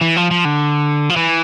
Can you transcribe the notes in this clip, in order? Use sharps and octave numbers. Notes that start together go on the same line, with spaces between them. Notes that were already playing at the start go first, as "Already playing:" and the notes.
E3
F3
F3
D3
F3
E3